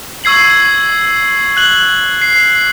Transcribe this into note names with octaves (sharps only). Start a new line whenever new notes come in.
C#6 E6 G#6 C7 F#7
F#6 F#7
C7